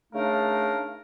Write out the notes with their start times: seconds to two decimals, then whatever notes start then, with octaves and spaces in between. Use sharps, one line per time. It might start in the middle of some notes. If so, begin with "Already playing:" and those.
0.13 C#3 A3 D4 D#4 A#4 F5